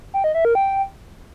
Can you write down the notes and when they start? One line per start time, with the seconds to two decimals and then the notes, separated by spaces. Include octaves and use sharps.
0.14 G5
0.24 D#5
0.34 E5
0.45 A#4
0.55 G5